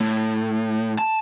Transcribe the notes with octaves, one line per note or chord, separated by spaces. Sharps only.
A2
A5